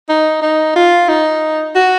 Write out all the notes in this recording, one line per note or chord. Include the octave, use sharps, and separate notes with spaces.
D#4
D#4
F4
D#4
F#4